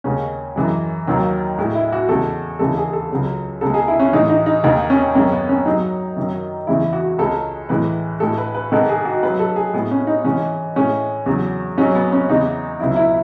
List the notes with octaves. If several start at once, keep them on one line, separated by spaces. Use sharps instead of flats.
D#2 C#3 G#3 C#4
F#2 E3 G#3
D#2 D#3 F#3
A2 G#3
E4
F#4
E2 C#3 G#3 A4
D#2 C#3 E3 G#3 A4
G#4
A4
C#2 C#3 F#3
C#2 B2 G#3 A4
G#4
E4
C#4
A2 E3 G#3 D#4
D#4
D#4
D#2 D#3 G#3 D#4
C#4
F#2 D#3 G#3 C#4
B3
C#4
G#2 F#3 D#4
F#2 D#3 F#3
E2 C#3 E3 G#3 E4
F#4
C#2 C#3 G#3 A4
A2 E3 G#3 B4
A2 G#3 A4
B4
B4
G#2 D#3 G#3 A4
G#4
F#4
G#2 F#3 B4
A4
G#4
A2 G#3 B3
C#4
D#4
G#2 E3 G#3 C#4
A2 G#3 C#4
E2 C#3 F#3
G#2 F#3 C#4
B3
C#4
E2 C#3 E3 G#3 D#4
C#2 B2 F#3 E4
E4